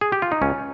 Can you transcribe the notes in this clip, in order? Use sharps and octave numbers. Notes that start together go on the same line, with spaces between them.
G#4
G4
F4
D#4
C#2 C#4